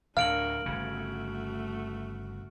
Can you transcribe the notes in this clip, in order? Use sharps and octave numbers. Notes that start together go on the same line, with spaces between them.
D2 A2 D4 A#4 F5 F6 D7 F#7
G1 C#3 A3 F#4